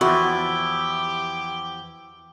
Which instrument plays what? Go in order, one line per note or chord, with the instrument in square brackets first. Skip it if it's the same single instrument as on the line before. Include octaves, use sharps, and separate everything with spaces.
[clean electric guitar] E2 F3 [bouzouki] E4 [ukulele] F#4 [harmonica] G5 D6